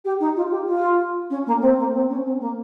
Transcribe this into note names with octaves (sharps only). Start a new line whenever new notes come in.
G4
D#4
F4
G4
F4
C#4
A#3
C4
A#3
C4
C#4
C4
A#3